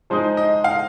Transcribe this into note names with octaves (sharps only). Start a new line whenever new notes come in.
F3 G#3 D#4 C5
D#5
F5